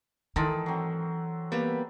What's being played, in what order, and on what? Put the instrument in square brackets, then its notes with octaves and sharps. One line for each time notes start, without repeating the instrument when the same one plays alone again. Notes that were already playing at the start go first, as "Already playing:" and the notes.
[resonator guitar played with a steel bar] G#2 D#3 [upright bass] E3 [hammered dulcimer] A4
[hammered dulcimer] F#3 C4
[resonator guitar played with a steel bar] G3 [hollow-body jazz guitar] A#3 B3